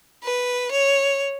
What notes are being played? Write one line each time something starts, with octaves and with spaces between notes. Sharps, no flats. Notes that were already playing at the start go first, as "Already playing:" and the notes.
B4
C#5